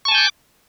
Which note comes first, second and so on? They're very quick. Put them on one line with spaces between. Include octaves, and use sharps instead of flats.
C#6 A5 G#5 G6 D6